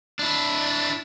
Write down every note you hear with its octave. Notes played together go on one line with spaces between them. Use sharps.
D4 E4